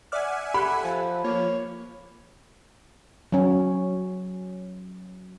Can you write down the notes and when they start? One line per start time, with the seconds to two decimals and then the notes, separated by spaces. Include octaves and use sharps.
0.12 D5 E5 F#5 G#5 D6 F6
0.54 G4 A4 B5 F#6
0.84 F3
1.24 F3 A#3 C#5
3.32 F#3 C#4